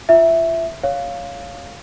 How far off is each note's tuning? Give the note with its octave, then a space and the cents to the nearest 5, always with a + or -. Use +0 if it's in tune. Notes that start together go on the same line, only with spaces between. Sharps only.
F4 -15 E5 +0
C#5 +15 F5 +0